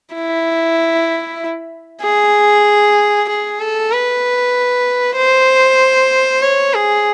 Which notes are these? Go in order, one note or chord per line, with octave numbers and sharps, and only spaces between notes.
E4
G#4
G#4
A4
B4
C5
C#5
G#4